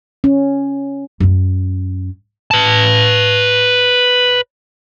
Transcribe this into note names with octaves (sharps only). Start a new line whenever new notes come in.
C#4
F#2 C#4
B4 A5